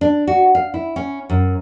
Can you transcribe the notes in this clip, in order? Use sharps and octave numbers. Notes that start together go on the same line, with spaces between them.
D4
F#4
F5
E4
C#4
F#2